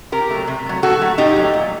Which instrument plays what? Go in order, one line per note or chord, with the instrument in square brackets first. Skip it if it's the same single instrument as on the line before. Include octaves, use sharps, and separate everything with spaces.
[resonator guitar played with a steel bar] C3 G4 A#4
F#3 A3
C3
F#3 A3
A2 F#4 A4
F#3 A3
A2 D#4 G4
F#3 A3
A#2